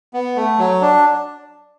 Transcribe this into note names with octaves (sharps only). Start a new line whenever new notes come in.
B3
A3
F#3
D4